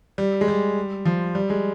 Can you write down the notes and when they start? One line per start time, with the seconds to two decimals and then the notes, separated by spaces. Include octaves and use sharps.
0.18 G3
0.41 G#3
0.48 G3
1.05 F3
1.35 G3
1.50 G#3